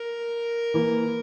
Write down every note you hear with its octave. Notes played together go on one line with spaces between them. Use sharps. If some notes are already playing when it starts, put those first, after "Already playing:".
Already playing: A#4
E3 A#3